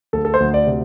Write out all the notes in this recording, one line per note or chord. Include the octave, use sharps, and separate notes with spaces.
D2 A4
A4
C5
D2
D5
C3